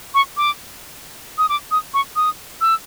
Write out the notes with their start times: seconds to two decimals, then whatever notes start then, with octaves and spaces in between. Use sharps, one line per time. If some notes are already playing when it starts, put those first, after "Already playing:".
0.14 C#6
0.37 D6
1.38 D#6
1.49 D6
1.71 D#6
1.94 C#6
2.16 D#6
2.61 E6